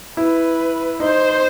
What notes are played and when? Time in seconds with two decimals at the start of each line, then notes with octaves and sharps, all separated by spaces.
0.17 E4 B4
1.00 D#4 C5